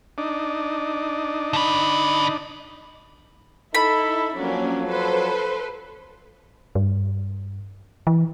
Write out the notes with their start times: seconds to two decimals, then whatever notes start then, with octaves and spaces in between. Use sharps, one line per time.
0.18 D4 D#4
1.53 D3 B4
3.75 D#4 E4 A4 B5
4.36 F3 F#3 A#3 C#4 D4
4.87 A4 B4 C5
6.75 G2
8.07 E3